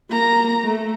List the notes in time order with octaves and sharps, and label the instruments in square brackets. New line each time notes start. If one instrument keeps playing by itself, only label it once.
[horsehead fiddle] A#3 A#5
A3